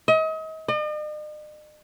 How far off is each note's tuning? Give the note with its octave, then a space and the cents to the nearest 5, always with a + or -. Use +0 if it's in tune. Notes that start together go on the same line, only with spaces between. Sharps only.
D#5 +35
D#5 -45